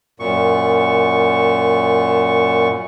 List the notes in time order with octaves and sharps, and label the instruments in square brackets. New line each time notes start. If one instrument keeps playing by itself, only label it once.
[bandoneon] F#2 A#2 C#6